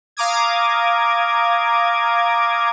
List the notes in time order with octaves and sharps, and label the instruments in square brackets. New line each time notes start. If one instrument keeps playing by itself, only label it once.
[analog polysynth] F5 A#5 D6 D#6 G#6